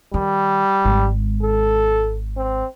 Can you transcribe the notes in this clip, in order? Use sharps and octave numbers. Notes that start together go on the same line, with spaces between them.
D#3 G3
G#1 G#3
A4
C4